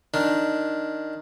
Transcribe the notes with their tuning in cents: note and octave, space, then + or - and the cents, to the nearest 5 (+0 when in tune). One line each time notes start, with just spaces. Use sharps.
D#3 +0 D4 +0